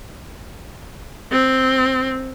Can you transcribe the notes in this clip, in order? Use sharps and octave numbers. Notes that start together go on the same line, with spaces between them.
C4